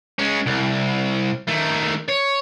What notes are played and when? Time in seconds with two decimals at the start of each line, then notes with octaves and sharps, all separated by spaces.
0.19 G#3 C#4
0.47 C2
1.48 D#3 A3
2.08 C#5